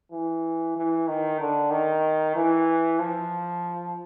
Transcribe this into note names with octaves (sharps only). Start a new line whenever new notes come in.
E3
E3
D#3
D3
D#3
E3
F3